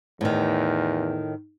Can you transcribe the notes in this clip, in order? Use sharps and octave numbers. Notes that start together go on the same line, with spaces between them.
E2 A2 D#3